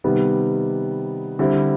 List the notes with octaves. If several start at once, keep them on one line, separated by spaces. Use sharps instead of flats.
C3 D#3 G3 B3
D3 G3 C4 E4